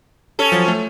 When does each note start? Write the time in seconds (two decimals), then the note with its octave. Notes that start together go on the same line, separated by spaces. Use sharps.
0.39 C#4 A4
0.52 F3 F#3
0.68 A3